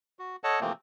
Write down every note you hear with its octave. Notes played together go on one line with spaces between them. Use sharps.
F#4
A4 C#5 D#5 F#5 A5
C3 E3 F3 A3 A#3 C4